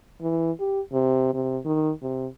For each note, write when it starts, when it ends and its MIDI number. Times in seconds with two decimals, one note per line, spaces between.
0.22 0.51 52
0.60 0.81 67
0.93 1.31 48
1.34 1.58 48
1.65 1.91 51
2.02 2.27 48